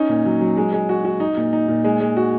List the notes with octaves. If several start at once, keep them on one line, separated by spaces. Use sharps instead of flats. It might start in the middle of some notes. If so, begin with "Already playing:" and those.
Already playing: C#4 D#4
A#2
F#3
F#3
G#3
G#3
F#4
F#4
D#4
A#2
D#4
A#2
G#3
G#3
F#4